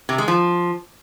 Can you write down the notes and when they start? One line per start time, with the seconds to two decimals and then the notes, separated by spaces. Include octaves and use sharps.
0.09 C3
0.18 G#3
0.28 F3